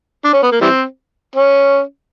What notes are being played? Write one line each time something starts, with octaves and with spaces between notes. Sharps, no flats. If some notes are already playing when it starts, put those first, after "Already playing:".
D4
C#4
B3
A#3
E3 G3 C4
C#4